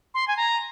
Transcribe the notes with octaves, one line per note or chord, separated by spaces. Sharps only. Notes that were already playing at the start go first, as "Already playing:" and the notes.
C6
G#5
A#5